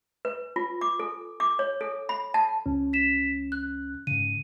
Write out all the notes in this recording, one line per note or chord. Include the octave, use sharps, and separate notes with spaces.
B4
F4
D6
A4
D6
C#5
A4
B5
A5
C#2 C#4
B6 E7
F#6
G#2 C#3 D#7